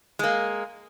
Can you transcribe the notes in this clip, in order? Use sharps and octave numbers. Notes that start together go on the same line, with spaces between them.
G#3 A#3